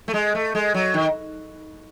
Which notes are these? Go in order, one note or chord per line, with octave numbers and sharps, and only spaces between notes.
A3
G#3
A3
G#3
F#3
D#3